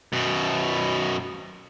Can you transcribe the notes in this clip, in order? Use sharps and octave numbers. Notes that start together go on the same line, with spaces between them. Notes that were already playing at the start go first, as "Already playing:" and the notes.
F#2 B2